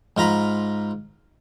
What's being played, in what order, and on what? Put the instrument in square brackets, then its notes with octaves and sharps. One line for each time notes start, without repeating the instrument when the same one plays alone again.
[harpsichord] G#2 F4 A#5 B5